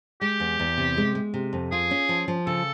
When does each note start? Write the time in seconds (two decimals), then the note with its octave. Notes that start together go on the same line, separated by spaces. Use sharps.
0.21 G#3 G4
0.40 E2
0.59 E2
0.78 C3
0.97 G#3
1.15 G#3
1.34 C3
1.53 F2
1.72 F4 G#4
1.91 C#4
2.09 F3
2.28 F3
2.47 C#3 A4